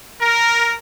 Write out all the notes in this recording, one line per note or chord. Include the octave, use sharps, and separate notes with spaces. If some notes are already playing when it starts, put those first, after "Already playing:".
A#4